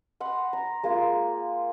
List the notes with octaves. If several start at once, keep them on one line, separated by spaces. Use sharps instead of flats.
D#5 F#5 B5 C6
A#5
G#3 A#3 F4 G#4